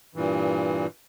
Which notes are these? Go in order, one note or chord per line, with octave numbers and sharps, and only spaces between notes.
G2 A#2 E3